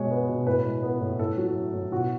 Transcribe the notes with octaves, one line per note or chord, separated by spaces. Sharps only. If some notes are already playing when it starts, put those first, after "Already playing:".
Already playing: B2 G#3 C#5
B3
B2
A2 B4
G#3
B3
A2
A2 A4
F#3
A3
A2
B2 F#4